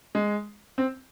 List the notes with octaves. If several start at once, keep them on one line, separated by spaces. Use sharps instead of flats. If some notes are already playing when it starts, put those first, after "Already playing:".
G#3
C4